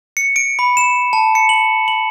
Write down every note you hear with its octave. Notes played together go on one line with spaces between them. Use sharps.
C#7
D7
B5
E7
A5
C#7
F#7
F#7